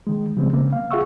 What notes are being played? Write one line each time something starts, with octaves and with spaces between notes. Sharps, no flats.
D#3 G#3
C#3 F3 G3 G#3 B3 C4
C#3 A#3 C4
F5
F4 G#4 E5 F#5 C#6 E6